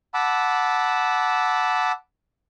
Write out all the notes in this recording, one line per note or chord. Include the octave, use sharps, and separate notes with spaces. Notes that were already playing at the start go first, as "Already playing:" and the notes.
F#5 A5 B5 D6 E6